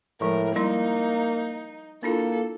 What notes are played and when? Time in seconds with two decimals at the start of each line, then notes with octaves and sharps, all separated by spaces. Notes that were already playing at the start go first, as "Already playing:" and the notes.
0.21 A2 F3 G#3 A#4
0.56 G3 A#3 D#4 E4 C6
2.03 A#3 D4 E4 F4 A4